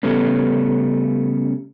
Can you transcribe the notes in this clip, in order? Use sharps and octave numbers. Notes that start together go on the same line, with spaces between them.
C#3 G3 A3 B3 C#4